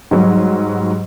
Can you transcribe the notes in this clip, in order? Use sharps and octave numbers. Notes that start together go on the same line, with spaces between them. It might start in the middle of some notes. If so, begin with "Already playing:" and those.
G#2 F#3 G3